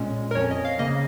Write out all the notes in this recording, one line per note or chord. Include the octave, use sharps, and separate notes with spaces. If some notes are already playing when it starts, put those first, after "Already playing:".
Already playing: A#2 G#3 C#4 C#5
A#4
F2 F3 C#4 C#5
D#5
F5
C#3 A#3 C#4 D#5